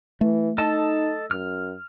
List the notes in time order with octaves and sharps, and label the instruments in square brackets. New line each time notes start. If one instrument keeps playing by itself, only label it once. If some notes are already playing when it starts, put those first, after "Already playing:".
[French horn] E3 [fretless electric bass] A3
[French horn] D#4 [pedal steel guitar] A4 D#5 A5
[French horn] F#2 [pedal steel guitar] F6